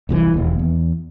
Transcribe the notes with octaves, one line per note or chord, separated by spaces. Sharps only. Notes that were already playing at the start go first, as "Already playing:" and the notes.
F1 C2 G#2 E3
E1 D#2
E2